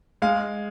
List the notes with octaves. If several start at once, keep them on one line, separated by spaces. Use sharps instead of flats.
G#3 F5